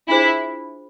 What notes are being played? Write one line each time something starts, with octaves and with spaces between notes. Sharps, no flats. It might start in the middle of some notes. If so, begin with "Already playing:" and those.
D4 E4 F4 G#4 C5